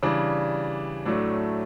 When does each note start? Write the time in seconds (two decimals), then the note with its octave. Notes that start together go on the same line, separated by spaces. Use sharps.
0.03 C#3 E3 G3 D4
1.05 A2 F#3 A3 D4